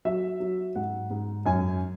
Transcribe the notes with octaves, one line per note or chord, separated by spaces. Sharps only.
F#3 E5
F#3
G#2 F#5
G#2
F#2 G#5